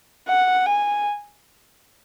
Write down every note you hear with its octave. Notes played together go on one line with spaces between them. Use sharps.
F#5
G#5